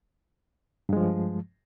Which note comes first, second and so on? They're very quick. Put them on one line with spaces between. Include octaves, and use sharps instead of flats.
G2 G#3 F3